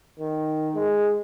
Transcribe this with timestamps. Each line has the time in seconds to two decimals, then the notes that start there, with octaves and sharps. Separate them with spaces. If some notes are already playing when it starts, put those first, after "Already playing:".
0.20 D#3
0.75 G#3